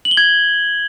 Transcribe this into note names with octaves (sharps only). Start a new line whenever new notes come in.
F#7
G7
G#6